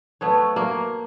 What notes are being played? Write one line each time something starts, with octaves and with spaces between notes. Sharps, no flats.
A3 B3 C#5
A#3